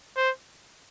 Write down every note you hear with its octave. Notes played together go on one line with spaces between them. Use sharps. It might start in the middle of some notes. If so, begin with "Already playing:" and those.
C5